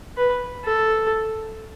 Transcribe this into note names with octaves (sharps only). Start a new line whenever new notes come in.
B4
A4